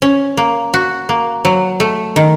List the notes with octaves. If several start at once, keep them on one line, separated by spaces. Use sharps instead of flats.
C#4
A#3
F#4
A#3
F#3
A3
D#3